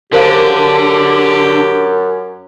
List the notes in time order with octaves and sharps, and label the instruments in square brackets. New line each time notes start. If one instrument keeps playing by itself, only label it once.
[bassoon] F#2 [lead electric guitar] D3 [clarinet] G4 [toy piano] A#4 C5 F5